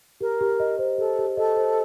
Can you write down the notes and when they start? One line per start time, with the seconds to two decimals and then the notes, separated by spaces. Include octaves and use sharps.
0.21 G4 A#4
0.41 G4
0.60 D#5
0.79 C5
0.98 G4 A4
1.18 G4
1.37 A4 D#5
1.57 C5